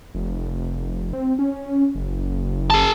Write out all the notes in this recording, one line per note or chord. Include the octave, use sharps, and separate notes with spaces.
F1
C4
C#4
F#1
G#4 A5